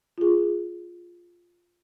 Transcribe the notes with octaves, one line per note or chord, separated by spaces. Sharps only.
F4 G#4